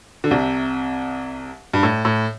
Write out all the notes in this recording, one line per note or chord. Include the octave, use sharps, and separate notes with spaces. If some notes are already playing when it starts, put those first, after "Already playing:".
D3
C2 C3
G2
A2
A2